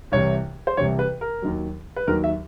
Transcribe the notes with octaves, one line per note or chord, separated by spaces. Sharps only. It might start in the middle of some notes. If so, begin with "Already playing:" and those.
C2 C3 E3 C#5
C5
C2 C3 E3 C#5
B4
A#4
D#2 D#3 F#3
B4
D#2 D#3 F#3 A#4
E5